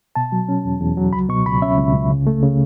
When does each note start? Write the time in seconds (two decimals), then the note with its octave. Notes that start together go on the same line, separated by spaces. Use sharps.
0.15 B2 A5
0.32 F#3
0.49 C#4
0.65 E2
0.81 E2
0.97 F#3
1.13 C#2 B5
1.29 B2 C#6
1.46 C#2 B5
1.62 C#4 E5
1.78 C#2
1.94 C#2
2.10 C#3
2.27 A3
2.43 C#3